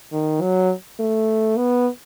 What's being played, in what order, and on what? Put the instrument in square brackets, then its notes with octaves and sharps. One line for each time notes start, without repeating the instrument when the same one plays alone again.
[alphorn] D#3
F#3
A3
B3